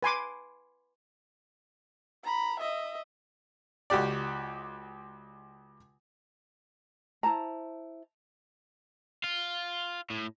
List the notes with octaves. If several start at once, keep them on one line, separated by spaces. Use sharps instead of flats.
B4 G#5 C6 D6
A#5 B5
D#5 E5
C#2 F#4 G4 D5
E4 C5 A5 A#5
F4
A2